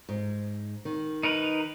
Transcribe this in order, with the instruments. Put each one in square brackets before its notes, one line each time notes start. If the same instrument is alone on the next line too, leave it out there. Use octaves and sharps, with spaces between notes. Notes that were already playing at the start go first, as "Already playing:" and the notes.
[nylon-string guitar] G#2
D#3
[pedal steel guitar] D#4 A#4 B4